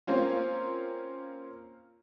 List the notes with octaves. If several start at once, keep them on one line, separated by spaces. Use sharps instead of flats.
A#3 C4 C#4 F4